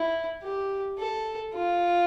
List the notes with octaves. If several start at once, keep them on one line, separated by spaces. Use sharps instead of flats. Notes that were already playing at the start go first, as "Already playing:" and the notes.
Already playing: E4
G4
A4
F4